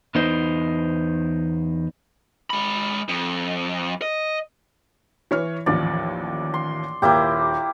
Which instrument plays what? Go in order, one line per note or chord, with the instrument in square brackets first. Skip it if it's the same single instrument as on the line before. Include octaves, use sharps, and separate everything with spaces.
[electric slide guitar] E2 B3 D#4 C5
[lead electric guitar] G#3 B5
F2
D#5
[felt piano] E3 C#5 F6
[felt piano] A1 D#2 F3 [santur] D5
[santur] C6
[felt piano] D#1 D#2 G6 [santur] A#3 E4 G4